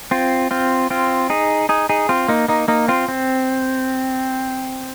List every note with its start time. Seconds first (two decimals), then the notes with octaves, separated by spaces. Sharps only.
0.11 C4 F4
0.51 C4 F4
0.90 C4 F4
1.30 D#4 G#4
1.69 D#4 G#4
1.89 D#4 G#4
2.09 C4 F4
2.28 A#3 D#4
2.48 A#3 D#4
2.68 A#3 D#4
2.88 C4 F4
3.08 C4